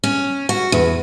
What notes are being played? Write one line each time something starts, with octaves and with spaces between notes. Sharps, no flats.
C#4
F#4
E2